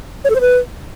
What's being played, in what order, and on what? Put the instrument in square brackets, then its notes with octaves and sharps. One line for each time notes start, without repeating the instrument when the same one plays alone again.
[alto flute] C#5
A4
C5
B4